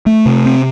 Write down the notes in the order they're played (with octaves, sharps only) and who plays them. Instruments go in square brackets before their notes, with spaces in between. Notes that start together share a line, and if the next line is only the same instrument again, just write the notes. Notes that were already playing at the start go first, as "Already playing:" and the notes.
[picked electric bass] A3
C3
C4